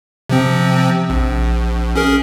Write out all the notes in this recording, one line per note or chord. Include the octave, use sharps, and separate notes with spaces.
C3 F3 C4
A#1
C#4 G#4 A#4